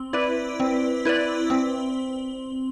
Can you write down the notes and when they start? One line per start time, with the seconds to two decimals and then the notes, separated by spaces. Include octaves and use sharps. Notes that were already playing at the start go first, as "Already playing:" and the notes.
Already playing: C4
0.13 E4 B4 D5
0.60 C4
1.05 E4 B4 D5
1.50 C4